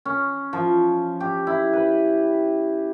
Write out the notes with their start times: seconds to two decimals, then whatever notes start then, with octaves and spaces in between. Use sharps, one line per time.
0.05 C#4
0.53 F3
1.20 G4
1.47 E4
1.73 B4